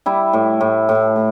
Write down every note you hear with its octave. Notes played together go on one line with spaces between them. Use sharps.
G3 E4
A2
A2
A2
A2